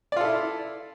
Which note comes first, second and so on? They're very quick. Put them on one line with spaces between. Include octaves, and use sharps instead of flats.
D5 F4 A4 E4